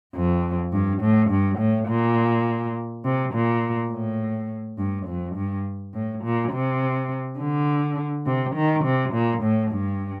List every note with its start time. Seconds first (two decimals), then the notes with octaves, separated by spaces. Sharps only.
0.15 F2
0.72 G2
1.02 A2
1.30 G2
1.59 A2
1.88 A#2
3.04 C3
3.34 A#2
3.91 A2
4.78 G2
5.07 F2
5.36 G2
5.94 A2
6.24 A#2
6.52 C3
7.39 D3
8.26 C3
8.55 D#3
8.84 C3
9.13 A#2
9.43 A2
9.71 G2